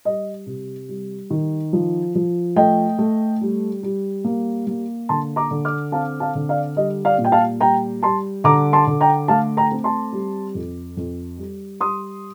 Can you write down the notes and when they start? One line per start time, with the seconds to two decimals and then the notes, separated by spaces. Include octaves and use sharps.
0.05 G3 D#5
0.46 C3
0.89 G3
1.30 D#3
1.73 F3
2.15 F3
2.56 A3 D#5 G5
2.99 A3
3.41 G3
3.83 G3
4.25 A#3
4.67 A#3
5.09 D3 A5 C6
5.36 A#5 D6
5.51 D3
5.65 D6 F6
5.92 C4 F5 A5
6.20 F5 A5
6.35 D3
6.49 D5 F5
6.76 G3 D#5
7.05 D5 F5
7.18 A#2
7.25 G5
7.32 F5 A5
7.60 G3 G5 A#5
8.02 G3 A5 C6
8.44 D3 A#5 D6
8.73 A5 C6
8.87 D3
9.01 G5 A#5
9.28 A3 F5 A5
9.57 G5 A#5
9.71 C4
9.84 A5 C6
10.13 G3
10.55 F2
10.97 F2
11.38 G3
11.81 G3 C6 D#6